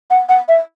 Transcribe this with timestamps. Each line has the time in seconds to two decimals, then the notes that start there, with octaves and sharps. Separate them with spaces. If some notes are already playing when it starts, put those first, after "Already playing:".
0.10 F#5
0.29 F#5
0.48 E5